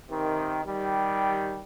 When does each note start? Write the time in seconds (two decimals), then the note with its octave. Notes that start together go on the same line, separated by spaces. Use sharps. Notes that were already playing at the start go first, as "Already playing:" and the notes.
0.09 C3 D#3
0.65 D#3 G3